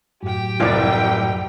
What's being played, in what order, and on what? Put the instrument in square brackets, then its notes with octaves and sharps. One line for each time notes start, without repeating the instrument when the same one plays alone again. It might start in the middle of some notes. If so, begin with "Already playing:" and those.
[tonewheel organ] F#2 A2 F#3 [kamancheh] G4 G5
[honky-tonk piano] F1 C2 [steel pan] F4 D5